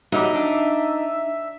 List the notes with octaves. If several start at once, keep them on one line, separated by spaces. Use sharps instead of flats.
F#3 G3 D#4 E5
D4